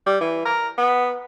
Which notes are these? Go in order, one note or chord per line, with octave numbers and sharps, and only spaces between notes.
G3
E3
A#4
B3